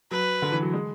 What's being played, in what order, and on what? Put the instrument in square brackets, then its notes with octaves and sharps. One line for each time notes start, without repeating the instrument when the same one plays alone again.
[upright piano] F#3 [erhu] B4
[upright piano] D3
E3
F#3
G#3